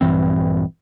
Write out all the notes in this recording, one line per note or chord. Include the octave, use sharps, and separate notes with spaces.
A#1 G2 E3 C4